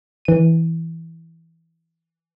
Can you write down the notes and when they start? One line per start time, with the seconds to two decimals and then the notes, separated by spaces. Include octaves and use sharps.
0.25 E3 D#7